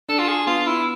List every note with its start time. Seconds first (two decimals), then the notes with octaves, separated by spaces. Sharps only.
0.09 D4 A4
0.19 F4
0.28 G#4
0.47 B3 F4
0.67 E4